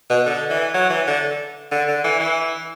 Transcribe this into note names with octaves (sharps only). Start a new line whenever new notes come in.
B2
D3
E3
F#3
E3
D3
D3
D3
E3
E3